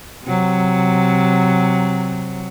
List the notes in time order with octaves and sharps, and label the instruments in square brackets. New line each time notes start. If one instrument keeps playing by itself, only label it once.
[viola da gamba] C3 F#3